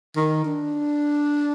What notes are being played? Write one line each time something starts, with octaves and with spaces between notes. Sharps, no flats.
D#3
D4